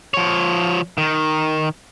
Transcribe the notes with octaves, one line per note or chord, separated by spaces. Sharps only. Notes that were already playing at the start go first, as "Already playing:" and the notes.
F3 C#5
D#3